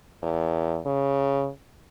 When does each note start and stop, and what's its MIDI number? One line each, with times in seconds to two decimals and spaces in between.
0.23 0.80 40
0.86 1.50 49